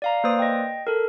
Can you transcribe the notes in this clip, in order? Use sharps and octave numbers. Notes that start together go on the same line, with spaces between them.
D5 F5 A#5
A#3 B4 C5 D5 D#6
D#5 G5
A4 A#4